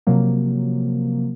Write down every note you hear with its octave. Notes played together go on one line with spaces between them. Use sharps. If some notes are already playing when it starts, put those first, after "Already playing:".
C3 F3 F#3 A#3